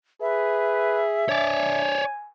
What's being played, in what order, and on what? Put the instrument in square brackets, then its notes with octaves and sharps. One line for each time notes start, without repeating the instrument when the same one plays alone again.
[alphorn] G#4 [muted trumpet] B4 [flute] E5
[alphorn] D4 [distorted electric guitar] C#5 D5 [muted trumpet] G#5